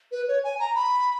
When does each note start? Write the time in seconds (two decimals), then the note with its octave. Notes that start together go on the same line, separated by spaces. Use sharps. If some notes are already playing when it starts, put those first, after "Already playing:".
0.12 B4
0.28 C#5
0.44 G#5
0.59 A#5
0.75 B5